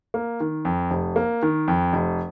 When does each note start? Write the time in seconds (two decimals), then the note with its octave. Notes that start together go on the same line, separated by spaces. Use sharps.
0.14 A#3
0.40 D#3
0.65 F2
0.91 F1
1.16 A#3
1.43 D#3
1.68 F2
1.93 F1